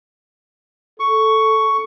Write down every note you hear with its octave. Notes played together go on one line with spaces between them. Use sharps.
A4 C#6